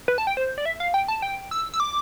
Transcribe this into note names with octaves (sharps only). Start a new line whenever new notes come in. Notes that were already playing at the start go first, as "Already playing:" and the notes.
B4
A5
G5
C5
D5
E5
F5
G5
A5
G5
E6
E6
D6